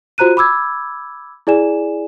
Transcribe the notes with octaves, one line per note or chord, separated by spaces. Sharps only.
F4 F#4 C5 A#5 F#6 D#7
B5 D6 E6 G#6
E4 G#4 D5 G#5 E7